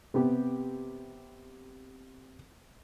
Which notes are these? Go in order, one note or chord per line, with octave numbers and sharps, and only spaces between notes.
C3 B3 G4